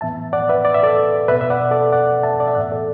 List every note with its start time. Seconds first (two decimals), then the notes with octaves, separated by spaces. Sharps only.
0.01 A2 E3 B3 E5 A5
0.33 D5 F#5
0.49 B4 E5
0.65 D5
0.74 E5
0.83 A4 D5
1.28 B2 B4 E5
1.31 B3
1.41 E5
1.50 D5 F#5
1.71 A4 D5
1.92 D5 F#5
2.23 E5 A5
2.40 D5
2.48 E5
2.55 A2 E3 B3 D5 F#5
2.72 A4 D5